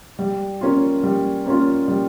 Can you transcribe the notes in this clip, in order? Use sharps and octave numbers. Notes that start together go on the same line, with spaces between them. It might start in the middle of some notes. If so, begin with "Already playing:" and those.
G3
A#3 C#4 F4
G3
A#3 C#4 F4
G3